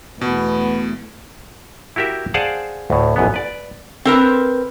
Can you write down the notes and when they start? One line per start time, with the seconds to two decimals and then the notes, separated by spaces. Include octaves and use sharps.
0.21 E2 B2 A3 B3
1.96 E4 F#4 G4 A#4 E5
2.34 G#4 C5 D5 F5 F#5 A5
2.90 D2 A2
3.16 A1 F#2 B3
3.34 B4 D5
4.05 C4 A#4 B4